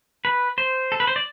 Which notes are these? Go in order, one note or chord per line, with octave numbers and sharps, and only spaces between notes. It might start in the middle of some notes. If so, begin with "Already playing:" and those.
B4
C5
A4
B4
C5
D5